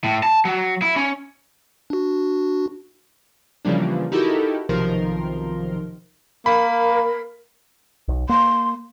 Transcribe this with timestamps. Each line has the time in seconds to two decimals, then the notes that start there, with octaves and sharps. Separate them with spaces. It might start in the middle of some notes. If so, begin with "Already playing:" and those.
0.04 A2
0.23 A5
0.45 F#3
0.82 E4
0.96 C#4
1.90 D4 F#4
3.65 C#3 E3 F3 G3 A#3 D4
4.12 D#4 E4 F#4 G4 A4 A#4
4.69 B1 C3 D#3 F3 A#4 C6
6.46 A#3 A#4 B5
8.08 B1
8.29 A#3 C6